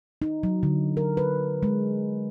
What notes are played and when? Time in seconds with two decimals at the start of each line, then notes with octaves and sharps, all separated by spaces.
0.22 D#4
0.43 F#3
0.63 D3
0.97 A#4
1.17 B4
1.63 G#3